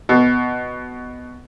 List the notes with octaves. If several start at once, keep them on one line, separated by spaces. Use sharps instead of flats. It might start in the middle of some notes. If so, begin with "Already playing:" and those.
B2